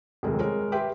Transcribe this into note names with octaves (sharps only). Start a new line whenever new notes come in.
D#1 F2 C3 G#3 A3 A#4
G#3 A#4 C#5
G4 B4 E5 G5 C6